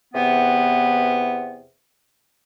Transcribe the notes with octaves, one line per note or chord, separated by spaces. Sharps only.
E2 C3 E3 B3